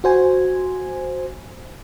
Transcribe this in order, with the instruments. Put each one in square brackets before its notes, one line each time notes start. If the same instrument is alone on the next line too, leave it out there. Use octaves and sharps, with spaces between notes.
[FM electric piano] F#4 C5 G#5